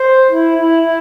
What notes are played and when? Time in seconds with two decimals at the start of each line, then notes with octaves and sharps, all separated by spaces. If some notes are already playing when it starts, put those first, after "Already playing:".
Already playing: C5
0.31 E4
0.58 E4
0.83 E4